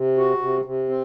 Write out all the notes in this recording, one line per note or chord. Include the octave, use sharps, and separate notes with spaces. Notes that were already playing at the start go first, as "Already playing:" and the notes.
Already playing: C3
F#4
C3
C3
C4